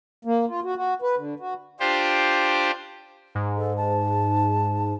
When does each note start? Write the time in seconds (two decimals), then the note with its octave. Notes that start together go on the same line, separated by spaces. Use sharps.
0.25 A#3
0.48 F4
0.64 F#4
0.76 F#4
1.02 B4
1.16 D3
1.40 F#4
1.80 D4 F4 G4 C5
3.35 G#2
3.57 A4
3.77 A5